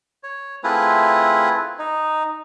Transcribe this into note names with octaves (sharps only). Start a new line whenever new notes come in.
C#5
A3 C4 E4 F4 G#4 B4
D#4